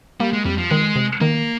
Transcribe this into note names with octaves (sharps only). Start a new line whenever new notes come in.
G3 A#3
G#3
F2 G3
F3
D#3 G#3
C3
D#3 A#3